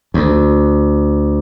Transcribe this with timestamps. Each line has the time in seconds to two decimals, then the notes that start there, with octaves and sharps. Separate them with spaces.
0.14 D2